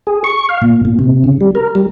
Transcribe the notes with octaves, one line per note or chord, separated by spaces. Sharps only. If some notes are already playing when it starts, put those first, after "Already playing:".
G#4
C#6
F5
A#2
A#2
C3
C#3
G3
A#4
G3